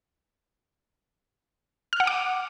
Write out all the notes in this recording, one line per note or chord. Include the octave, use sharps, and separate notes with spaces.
F6
F#5
D6